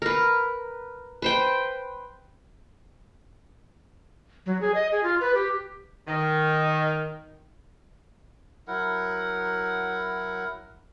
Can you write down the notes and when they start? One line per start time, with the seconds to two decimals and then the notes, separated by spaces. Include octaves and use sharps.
0.02 A#4 B4
1.22 B4 C5 G5
4.46 F#3
4.61 G#4
4.74 D#5
4.92 G#4
5.03 F4
5.21 B4
5.35 G4
6.08 D#3
8.68 F#3 E4 A#4 F#5